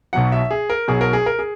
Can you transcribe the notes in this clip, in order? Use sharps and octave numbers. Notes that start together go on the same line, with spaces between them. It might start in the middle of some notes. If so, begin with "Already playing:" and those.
B1 B2 F#3 F#5
E5
G#4
A#4
B1 B2 F#3 G#4
A#4
G#4
A#4
G#4